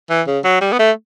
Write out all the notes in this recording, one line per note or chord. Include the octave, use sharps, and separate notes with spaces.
E3
C#3
F#3
G3
B3
A3